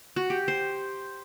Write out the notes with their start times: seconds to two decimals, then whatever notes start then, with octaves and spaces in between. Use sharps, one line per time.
0.16 F#4
0.30 G4
0.48 C5